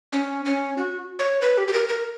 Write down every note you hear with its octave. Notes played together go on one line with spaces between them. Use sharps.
C#4
C#4
F#4
C#5
B4
G4
G4
A#4
A#4